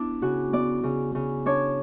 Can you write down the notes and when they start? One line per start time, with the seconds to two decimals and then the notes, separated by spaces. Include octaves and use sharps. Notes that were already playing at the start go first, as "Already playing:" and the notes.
Already playing: B3 D4 E4
0.22 C#3 F#4
0.53 B3 D5
0.84 C#3
1.15 C#3
1.46 D4 C#5